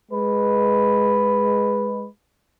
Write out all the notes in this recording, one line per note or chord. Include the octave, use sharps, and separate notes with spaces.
G#3 B4